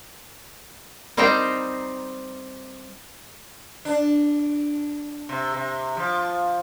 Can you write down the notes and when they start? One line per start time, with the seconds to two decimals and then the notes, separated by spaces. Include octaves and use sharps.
1.17 G3 C4 D#4 C5 G5 A#5
3.85 D4
5.29 C3
5.53 C3
5.97 F3